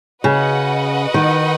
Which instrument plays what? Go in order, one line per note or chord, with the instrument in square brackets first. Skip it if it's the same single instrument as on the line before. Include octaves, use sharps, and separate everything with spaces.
[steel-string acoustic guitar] C#3 [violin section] F#4 B4 D#5 F#5
[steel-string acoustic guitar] D#3